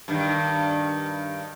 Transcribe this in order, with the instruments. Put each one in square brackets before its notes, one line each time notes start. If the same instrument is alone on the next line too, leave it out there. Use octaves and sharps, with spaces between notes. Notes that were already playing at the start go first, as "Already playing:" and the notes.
[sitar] G2 D#3